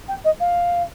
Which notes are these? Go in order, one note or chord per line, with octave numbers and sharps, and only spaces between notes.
G5
D#5
F5